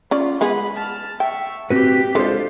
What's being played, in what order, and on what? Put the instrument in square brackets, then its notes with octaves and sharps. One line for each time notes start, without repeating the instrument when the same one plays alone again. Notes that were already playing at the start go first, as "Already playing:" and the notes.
[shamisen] C#4 D5 [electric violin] F4
[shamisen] G#3 B3 G#4 [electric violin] B5
[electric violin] A5 F6
[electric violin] E5 C#6 [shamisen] G5
[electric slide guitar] C4 F#4 B4 [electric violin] G4 B6
[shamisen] G#3 [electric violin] D4 F4 [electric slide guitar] A4 B4 C5